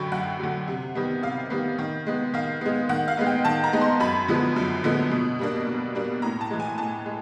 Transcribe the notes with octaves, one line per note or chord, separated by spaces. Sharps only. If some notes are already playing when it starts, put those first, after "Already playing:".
Already playing: F#2 D3 F#3 G5 B5 C#6
F#2 F#5
D3 F#3
C3
D#3 G3 B3
C3 F5
D#3 G3 B3
D#3
G#3 B3
D#3 F5
G#3 B3
D#3 F#5
F5
G#3 B3 D#4
G5
D#3 A5
A#5
G#3 B3 D#4
C6
F#2 B5
D3 F3 G#3 B3
F#2
D3 F3 G#3 B3
B2
G3 A#3 D4
B2
G3 A#3 D4
A2 A#5
A5
E3 G#3
G#5
A2 A5
G#3